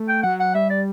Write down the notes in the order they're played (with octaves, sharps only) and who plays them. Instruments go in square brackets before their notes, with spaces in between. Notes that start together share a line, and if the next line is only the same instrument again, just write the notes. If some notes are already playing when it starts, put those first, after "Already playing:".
Already playing: [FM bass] A3
[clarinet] G5
[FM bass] F#3 [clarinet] F#5
[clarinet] F#5
[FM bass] G3 [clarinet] E5
[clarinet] D5